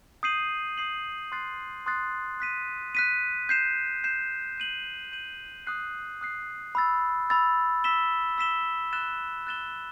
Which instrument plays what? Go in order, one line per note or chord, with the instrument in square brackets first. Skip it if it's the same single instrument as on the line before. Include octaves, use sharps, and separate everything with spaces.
[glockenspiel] D#6 G6 C7 D#7 F#7
D#6 G6 C7 D#7 F#7
C6 D#6 F#6 A6 C7
C6 D#6 F#6 A6 C7
F#6 B6 D#7
F#6 B6 D#7
G6 C7 E7
G6 C7 E7
G6 D#7 F#7
G6 D#7 F#7
D#6 F#6 C7
D#6 F#6 C7
B5 E6 A6
B5 E6 A6
E6 B6 E7 G7
E6 B6 E7 G7
F#6 A6 E7 G7
F#6 A6 E7 G7